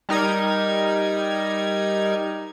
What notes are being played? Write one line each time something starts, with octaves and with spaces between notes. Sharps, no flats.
G3 D#4 A#4 G#6